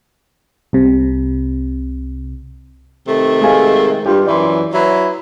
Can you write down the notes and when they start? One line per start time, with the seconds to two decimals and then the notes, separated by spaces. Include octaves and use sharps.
0.73 C2 C3
3.08 C3 D#3 A3
3.41 G#3 F5 G#5
4.06 G2 F4 G4
4.27 F#2 E3 D5 C6
4.74 F#3 E4 B4